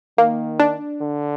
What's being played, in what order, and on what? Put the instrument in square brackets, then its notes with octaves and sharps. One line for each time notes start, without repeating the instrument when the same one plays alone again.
[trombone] D#3 [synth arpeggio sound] A#3
[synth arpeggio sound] D4
[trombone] D3